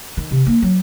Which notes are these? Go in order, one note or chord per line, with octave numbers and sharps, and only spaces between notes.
D#3
C3
D#3 A#3
F#3